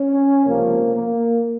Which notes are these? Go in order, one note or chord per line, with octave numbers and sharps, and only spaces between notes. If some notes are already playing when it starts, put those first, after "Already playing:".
Already playing: C#4
C#2 C3 F3 A#3
A#3